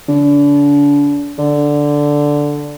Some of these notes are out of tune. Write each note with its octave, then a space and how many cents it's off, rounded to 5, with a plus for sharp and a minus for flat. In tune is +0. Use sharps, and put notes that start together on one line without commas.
D3 -35
D3 -5